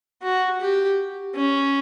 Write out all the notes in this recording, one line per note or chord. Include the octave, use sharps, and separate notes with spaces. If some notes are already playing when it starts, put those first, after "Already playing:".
F#4
G4
C#4